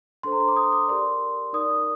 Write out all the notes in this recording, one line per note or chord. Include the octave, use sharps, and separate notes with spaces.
D4 A4 C5 C6
A#5
C6
D6
D#6
D6
G4 A#4 D5 C6
D#4 A#4 D5 D#6